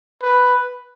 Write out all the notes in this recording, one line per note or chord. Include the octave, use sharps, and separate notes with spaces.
B4